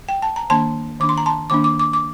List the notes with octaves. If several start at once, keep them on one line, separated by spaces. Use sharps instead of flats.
G5
A5
A#5
D#3 A#3 D4 A5 C6
D#3 A#3 D4 D6
C6
A#5
A5 C6
D#3 A#3 D4 D6
D6
D6
D6